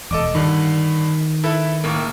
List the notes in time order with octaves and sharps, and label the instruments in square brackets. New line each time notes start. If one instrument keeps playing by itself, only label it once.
[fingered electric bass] E1 [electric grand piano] A4 D#5 D6
[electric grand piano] G2 D3 [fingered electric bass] D#3
[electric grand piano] E4 A4 B4
C#2 A2 A#3